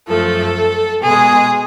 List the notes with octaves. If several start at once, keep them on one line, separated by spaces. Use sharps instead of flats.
F#2 F3 A3 A4
B2 G#3 G#4